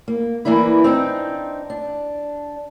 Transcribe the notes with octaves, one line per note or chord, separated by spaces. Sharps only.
A#3
E3 A#3 D4 E4 B4
C4 D4 D#4
D4